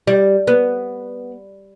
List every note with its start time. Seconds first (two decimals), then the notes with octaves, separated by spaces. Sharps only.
0.07 G3
0.47 B3